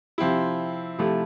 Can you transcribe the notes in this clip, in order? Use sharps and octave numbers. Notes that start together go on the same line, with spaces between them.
C3 F3 C4 E4
C3 F3 A3 E4